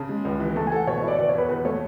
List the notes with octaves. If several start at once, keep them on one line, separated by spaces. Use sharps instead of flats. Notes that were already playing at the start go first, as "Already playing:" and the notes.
Already playing: C#3 A5
G#3
C#2
E3
A3 A5
G#5
A4 F#5
B2 C#5
C#5
E4
D5
B2 D5
E2 C#5
B4
E2 B4
A3 C#5